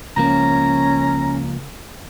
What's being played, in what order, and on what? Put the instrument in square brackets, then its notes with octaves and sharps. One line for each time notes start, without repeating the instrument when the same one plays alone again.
[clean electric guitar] C#2 F3 A#3 [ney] C#4 [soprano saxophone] A#5